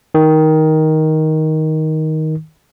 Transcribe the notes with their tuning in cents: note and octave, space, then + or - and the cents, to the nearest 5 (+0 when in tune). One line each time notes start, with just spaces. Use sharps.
D#3 +10